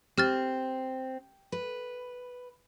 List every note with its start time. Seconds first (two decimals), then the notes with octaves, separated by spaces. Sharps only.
0.18 C4 G4 F6 A6
1.52 B4